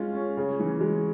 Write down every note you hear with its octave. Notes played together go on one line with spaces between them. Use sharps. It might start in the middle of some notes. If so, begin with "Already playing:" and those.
Already playing: G#3 C#4 F4
C#4
C#3
E3
G#3